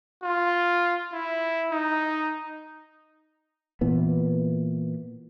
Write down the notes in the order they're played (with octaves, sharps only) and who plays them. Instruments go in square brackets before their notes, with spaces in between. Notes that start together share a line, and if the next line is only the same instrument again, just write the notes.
[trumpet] F4
E4
D#4
[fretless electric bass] A#2 E3 B3